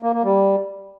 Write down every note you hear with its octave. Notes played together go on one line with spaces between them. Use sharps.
A#3
A#3
G3